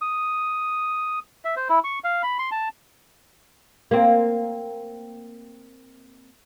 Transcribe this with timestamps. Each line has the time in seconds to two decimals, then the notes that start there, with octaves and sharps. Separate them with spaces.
0.02 D#6
1.45 E5
1.57 C5
1.69 E4
1.84 C#6
2.04 F5
2.23 B5
2.39 C6
2.52 A5
3.91 A#3 C4